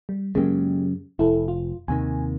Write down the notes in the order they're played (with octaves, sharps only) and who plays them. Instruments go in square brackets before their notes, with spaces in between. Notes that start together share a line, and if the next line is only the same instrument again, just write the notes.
[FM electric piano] G3
[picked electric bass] F#2 C#3 [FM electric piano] G#3 A#3 G4
[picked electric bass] F1 [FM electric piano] E4 A4
[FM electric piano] F4
[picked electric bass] D#2 C3 D#3 [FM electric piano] G#5